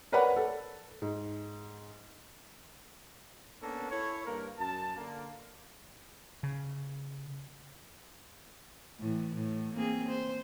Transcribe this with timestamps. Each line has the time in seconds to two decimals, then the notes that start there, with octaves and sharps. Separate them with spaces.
0.12 A#4 B4 C#5 D5 F#5 B5
0.36 A4
1.02 G#2
3.62 A#3 B3 C#4 D4 A4
3.91 E4 A4 C#5
4.26 G2 A#3 A#4
4.59 F#2 A5
4.97 D3 A#3
6.43 C#3
8.99 A2 E3
9.34 A2
9.74 A#3 C4 G#4
10.09 C5